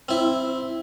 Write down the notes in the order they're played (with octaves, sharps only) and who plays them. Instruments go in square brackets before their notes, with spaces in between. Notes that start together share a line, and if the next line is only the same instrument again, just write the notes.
[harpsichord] C4 E4